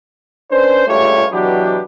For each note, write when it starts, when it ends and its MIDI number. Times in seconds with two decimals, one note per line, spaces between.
0.51 0.84 61
0.51 0.84 62
0.51 0.84 71
0.51 0.84 72
0.88 1.26 37
0.88 1.26 43
0.88 1.26 57
0.88 1.26 65
0.88 1.26 67
0.88 1.26 73
1.32 1.81 47
1.32 1.81 52
1.32 1.81 54
1.32 1.81 59
1.32 1.81 62
1.32 1.81 67